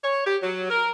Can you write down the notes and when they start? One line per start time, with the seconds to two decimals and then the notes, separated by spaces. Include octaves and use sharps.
0.03 C#5
0.26 G4
0.41 F#3
0.70 A#4